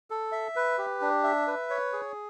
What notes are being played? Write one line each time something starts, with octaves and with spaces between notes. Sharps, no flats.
A4
E5
B4
G4
D4
E5
B4
C#5
G#4